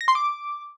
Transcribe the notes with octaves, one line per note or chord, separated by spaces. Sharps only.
A#6
C6
D6